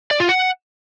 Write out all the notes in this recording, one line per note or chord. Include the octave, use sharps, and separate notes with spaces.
D5
F4
F#5